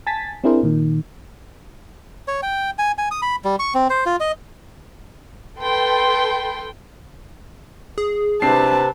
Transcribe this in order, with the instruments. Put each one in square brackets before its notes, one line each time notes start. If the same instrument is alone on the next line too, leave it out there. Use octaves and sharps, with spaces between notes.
[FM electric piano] G#5 A5 A6 B6
C4 D4 E4 G#4 A#4 C5
A#2 D#3
[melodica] C#5
G5
G#5
G#5
D#6
B5
G3
C#6
C4
C5
F4
D#5
[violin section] A4 B4 G5 C6
[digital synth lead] G#4
[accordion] C3 [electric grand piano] C4 D4 C7 [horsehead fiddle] B4 A5